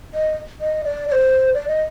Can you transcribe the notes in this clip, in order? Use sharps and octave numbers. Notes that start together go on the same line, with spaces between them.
D#5
D#5
D5
D5
C5
D5
D#5